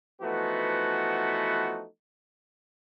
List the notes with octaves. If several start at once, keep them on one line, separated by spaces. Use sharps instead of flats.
E3 F3 A3 B3 D#4 F#4